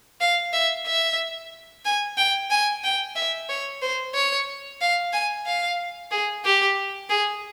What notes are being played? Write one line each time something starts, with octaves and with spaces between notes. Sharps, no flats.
F5
E5
E5
G#5
G5
G#5
G5
E5
C#5
C5
C#5
F5
G#5
F5
G#4
G4
G#4